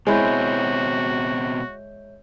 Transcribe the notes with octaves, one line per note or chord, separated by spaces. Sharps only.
B2 G#3 C4 E4 F#4 C#5 E5 G6